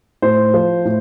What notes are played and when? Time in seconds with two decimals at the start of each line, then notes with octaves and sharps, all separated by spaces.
0.22 A2 C5
0.54 F3
0.85 A2